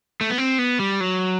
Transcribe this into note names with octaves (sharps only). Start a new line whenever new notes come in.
A3
B3
C4
B3
G3
F#3